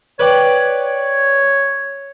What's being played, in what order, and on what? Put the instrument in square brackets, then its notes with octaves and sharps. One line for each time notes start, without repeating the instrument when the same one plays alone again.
[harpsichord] B4 D5 G5 [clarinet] C#5